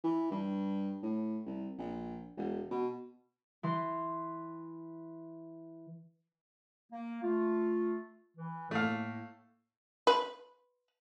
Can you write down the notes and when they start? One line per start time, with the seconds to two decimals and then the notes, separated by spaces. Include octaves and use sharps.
0.04 E3
0.31 G2
1.03 A2
1.46 C2
1.78 A#1
2.37 E1
2.71 B2
3.63 E3 C6
6.92 A#3
7.23 A3 F4
8.37 E3
8.71 A2 A3 A#3 F5
10.07 B4